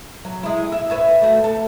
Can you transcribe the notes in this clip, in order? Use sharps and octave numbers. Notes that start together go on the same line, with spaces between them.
F#3
G#3 E4
E5
B4 C#5 E5
A3 F#4
A4